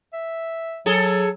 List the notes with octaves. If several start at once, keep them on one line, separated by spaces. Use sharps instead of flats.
E5
F#3 G#4 A4